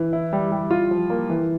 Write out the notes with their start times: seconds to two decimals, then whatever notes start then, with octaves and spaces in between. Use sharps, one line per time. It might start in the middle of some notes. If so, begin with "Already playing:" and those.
Already playing: E3
0.13 E4
0.33 G3
0.52 G3
0.71 F4
0.91 F3
1.10 A#3
1.30 E3